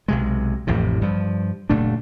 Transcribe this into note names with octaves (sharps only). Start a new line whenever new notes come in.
B1 C3 G#3
A1 F2 A2 C3
G2 F3
F#1 A#2 A3 D4